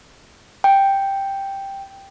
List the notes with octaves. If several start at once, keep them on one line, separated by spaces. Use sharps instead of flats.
G5